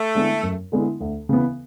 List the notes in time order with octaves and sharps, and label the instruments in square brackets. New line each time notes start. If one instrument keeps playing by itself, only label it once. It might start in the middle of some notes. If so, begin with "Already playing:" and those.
Already playing: [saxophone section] A3
[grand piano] D3 G#3 B3 E4
F#2
D3 G#3 B3 E4
D2
C#3 E3 B3